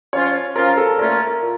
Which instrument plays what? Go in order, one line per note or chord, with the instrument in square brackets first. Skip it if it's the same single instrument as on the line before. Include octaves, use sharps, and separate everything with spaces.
[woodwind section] F3 C#4 F4 [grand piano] C#5
[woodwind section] F3 C#4 F4 [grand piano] A#4
[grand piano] A4
[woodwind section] A#2 A3 C#4 F4 [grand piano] A#4
[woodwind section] A#2